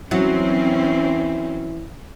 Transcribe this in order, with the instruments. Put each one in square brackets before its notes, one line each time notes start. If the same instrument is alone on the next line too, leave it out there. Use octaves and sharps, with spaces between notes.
[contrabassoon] E3 [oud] F#3 [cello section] C4 C#4